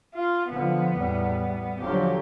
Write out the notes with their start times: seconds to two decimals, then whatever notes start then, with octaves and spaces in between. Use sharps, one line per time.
0.14 F4
0.50 D3 F3 B3
0.94 E2 A2 G3
1.80 D3 F3 F#3 G4